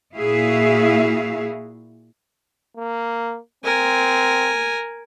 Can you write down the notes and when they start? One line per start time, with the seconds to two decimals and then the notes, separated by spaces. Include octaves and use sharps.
0.16 A#2 E4 F#4 G#4 E5 F5
2.77 A#3
3.64 C4 A#4 G#5